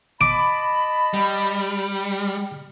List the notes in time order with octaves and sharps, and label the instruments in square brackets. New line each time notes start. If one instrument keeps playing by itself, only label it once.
[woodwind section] D#5 A5 B5 [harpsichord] D6
[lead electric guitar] G3